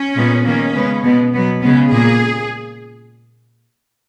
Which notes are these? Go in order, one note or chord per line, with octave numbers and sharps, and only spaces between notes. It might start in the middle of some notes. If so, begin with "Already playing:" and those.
Already playing: C#4
A#2 G#3 B3
D#3 A#3 C#4
C#3 G#3 B3
B2 G#3 B3
B2 F#3 B3
C#3 G#3 B3 C#4
A#2 A#3 G#4